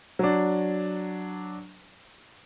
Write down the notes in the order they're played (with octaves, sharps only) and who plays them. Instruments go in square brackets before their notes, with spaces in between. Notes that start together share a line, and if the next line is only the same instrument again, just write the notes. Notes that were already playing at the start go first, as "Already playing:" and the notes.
[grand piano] F#3 D4